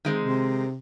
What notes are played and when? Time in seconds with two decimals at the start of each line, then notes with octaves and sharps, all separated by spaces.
0.05 D#3 G#3 C4
0.20 C3